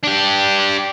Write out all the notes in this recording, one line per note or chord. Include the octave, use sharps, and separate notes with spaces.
D4 G4